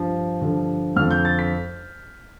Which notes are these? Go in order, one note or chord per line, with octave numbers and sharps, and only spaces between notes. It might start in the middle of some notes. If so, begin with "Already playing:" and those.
Already playing: G2 F3
G2 D3 F3
F2 D3 F3 F6
G6
A6
B6